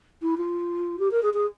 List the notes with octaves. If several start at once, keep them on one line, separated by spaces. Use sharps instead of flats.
E4
F4
G4
A#4
G#4
G#4